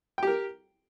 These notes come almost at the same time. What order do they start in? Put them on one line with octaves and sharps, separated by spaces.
G5 G4 A#4